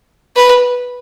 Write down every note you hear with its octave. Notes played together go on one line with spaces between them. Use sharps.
B4